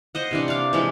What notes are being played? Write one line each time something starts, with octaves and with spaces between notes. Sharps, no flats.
C5 D#5 F#5
C3 E3 D4
D5 F5
E3 F3 G#3